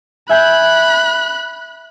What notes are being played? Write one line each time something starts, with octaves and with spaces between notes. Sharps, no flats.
E5 G#5 B5 F#6 G6